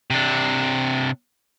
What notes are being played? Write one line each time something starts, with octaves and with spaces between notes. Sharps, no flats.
C3 D4